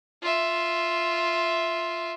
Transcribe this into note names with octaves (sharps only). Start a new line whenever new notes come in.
F4 E5